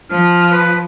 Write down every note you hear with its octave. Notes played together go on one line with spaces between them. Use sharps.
F3 F6
B4